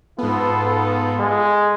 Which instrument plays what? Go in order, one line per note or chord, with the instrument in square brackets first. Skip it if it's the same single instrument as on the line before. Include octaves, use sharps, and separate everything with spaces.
[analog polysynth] G#2 B3 [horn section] F4 A4
[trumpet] G#3